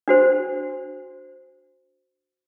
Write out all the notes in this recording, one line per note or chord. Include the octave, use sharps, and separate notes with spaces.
D4 F#4 C5